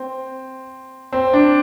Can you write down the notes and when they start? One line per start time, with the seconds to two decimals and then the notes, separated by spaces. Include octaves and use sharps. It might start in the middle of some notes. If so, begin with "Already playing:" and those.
Already playing: C4
1.12 C4
1.33 D4